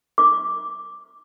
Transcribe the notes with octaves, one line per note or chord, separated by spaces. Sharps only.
D6